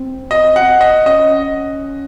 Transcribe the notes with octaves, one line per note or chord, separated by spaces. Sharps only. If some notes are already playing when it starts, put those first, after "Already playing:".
Already playing: C4
D#5
F#5
D#5
C#4 D#5